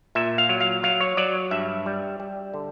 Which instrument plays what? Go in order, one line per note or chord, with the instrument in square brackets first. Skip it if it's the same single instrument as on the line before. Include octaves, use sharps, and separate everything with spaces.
[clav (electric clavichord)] A#2 E5
F5
F#3
F5
F#3 F5
C#5
F#3 D5
G2 E5
G3
G3
D3